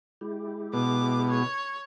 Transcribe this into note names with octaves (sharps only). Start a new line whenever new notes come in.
G#3 E4 G4
B2 D6
C#5